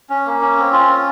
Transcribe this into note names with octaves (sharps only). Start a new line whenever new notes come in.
C#4
A#3
C#4
C4
F4
C#4